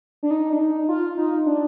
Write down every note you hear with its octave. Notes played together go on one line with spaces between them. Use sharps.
D4
D#4
D4
D#4
F4
D#4
D4